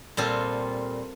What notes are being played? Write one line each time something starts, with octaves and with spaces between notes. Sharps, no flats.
A#2 G3 C4 F4 A4